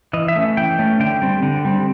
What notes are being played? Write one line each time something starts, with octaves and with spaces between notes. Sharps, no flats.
E3 D#5
E5
A3 C#4
E3 G5
A3 C#4
D3 G5
G3 C4
D3
G3 C4